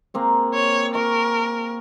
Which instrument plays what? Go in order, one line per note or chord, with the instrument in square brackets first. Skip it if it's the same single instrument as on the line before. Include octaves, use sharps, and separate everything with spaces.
[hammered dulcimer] A#3 C4 G#4
[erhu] C#5
[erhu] A#4 [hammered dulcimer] C#6